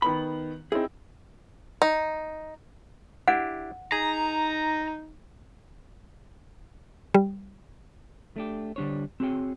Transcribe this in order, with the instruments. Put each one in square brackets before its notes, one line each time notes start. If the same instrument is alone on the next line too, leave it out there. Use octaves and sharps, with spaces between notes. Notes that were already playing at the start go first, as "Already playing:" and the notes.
[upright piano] D#3 B3 F#7 [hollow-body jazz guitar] B5
[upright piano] C4 D#4 E4 [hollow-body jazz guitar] G#4
[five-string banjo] D#4
[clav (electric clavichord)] D4 E4 G4 [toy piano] F#5
[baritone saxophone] D#4 [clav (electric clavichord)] G#4 [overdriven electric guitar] A#5
[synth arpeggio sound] G3
[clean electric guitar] A3 D4 G4
D3 G3 D4 C5 C#5
C4 F#4 G#4 C#5 G5